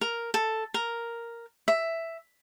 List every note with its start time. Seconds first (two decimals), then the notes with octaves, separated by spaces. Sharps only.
0.01 A#4
0.34 A4
0.74 A#4
1.68 E5